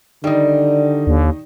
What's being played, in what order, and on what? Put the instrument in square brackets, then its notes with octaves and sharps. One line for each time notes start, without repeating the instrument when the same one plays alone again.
[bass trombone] D3 [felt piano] D#3 D#4 [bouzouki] G3
[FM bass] D#2